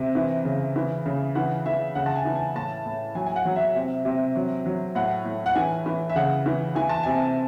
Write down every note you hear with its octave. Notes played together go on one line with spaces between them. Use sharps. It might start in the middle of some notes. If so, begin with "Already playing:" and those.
Already playing: C3 E5
E3
C#3
E3
C#3
E3 F#5
E3 E5
C#3 F#5
A5
G#5
E3
G#5
A2 A5
A2
F#3 G#5
G#5
F#5
F#3
E5
C3
C3
F#3
F#3
A2 F#5
A2
F#5
E3 G#5
E3
E5
C#3 F#5
E3
E3 G#5
A5
C3 G#5